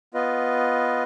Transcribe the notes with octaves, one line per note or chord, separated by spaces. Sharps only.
B3 F4 B4 D#5